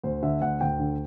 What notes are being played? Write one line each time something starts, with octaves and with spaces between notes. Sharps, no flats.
D2 C5
D3 E5
D2 F#5
D2 G5
D3